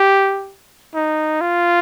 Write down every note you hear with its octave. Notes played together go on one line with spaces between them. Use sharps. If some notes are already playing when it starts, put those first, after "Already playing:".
Already playing: G4
D#4
F4